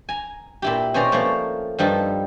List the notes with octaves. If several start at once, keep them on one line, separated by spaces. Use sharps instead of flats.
G#5 A#5
A#2 E4 G4
B2 C#4 C5 D5 A#5
F3 A3 A#3 C#5 D5 F5
G2 F3 G3 D#4 A4